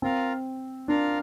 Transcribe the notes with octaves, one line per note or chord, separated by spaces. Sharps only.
C4 F4 A#4 F5
D4 F4 A#4 F5